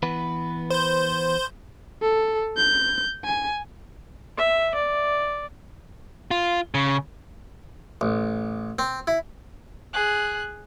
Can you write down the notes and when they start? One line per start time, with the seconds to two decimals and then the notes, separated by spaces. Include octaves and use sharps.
0.03 E3 B3 B4
0.71 C5 G6
2.02 A4
2.57 G6
3.24 G#5
4.37 E5
4.75 D5
6.31 F4
6.75 C#3
8.01 A1
8.79 C4
9.07 E4
9.93 G#4 F#6